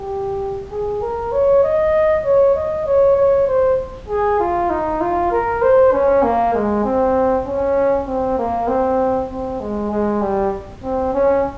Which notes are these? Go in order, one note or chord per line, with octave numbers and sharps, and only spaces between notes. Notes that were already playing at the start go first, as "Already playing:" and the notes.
Already playing: G4
G#4
A#4
C#5
D#5
C#5
D#5
C#5
C#5
C5
G#4
F4
D#4
F4
A#4
C5
C#4
A#3
G#3
C4
C#4
C4
A#3
C4
C4
G#3
G#3
G3
C4
C#4